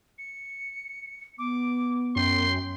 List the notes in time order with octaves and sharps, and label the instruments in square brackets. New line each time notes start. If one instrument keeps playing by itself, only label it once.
[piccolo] C#7
[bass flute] B3 [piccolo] D6
[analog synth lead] F#2 [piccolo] G5 [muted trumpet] C6